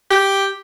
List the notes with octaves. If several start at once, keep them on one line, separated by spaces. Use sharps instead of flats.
G4